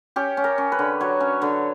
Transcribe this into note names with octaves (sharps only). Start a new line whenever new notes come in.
C#4 G4
C#4
A#4
C#4
B4
D3
F#3 C#5
C#4
D3